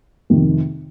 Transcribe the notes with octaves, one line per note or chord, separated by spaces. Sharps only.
F2 C3 D#3